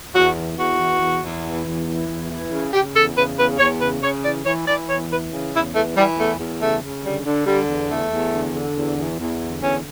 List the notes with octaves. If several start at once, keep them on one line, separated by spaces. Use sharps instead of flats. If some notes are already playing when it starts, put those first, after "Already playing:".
E2 F#4
E3
E2 F#4
E3
E2
E2
E3
E2
E3
E2
E3
C#3
C#3 G4
E2 A4
C#3 B4
E2 B4
E2 C#5
C#3 B4
C#3 C#5
E3 D5
E3 C#5
E3 D5
E2 C#5
E3 B4
C#3
E2 E4
E3 A3
E3 G3
E2 A3
E2
C#3 A3
C#3
D3 G3
D3
D3 G3
E2
E2 A3
E2
D3
D3
E2
E2
E2
D3
E2 C#4